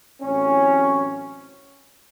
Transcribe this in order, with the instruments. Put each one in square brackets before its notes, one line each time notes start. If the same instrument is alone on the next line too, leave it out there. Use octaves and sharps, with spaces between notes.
[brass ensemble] A1 A2 F#3 C4 C#4